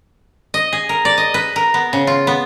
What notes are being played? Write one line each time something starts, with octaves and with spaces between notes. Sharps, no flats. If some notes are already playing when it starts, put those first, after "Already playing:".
D#5
G#4
A#4
D5
D#5
B4
A#4
B3
C#3
F4
B3